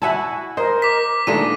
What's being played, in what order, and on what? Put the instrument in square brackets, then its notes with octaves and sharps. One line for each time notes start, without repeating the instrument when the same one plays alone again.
[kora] E4 F#5 [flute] F#4 [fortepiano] E5 G#5 A5
[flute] A#4 [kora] C5 [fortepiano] D#5
[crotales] D6 B6
[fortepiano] A#2 D#3 A3 [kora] G#3 B3 D4 [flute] A4 [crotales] D#7